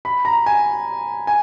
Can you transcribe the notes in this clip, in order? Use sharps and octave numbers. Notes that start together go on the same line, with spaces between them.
B5
A#5
G#5
G#5